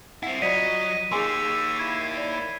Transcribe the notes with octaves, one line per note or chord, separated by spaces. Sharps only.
C4 E4 F#5
F#3 F4 D5 D#5 B6 D#7
A#3 D#4 G#4 G#5 C6 C#6 E6
E4 G#6
D5